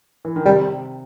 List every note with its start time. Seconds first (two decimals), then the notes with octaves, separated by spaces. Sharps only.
0.25 E3
0.36 D#3
0.45 C3 G3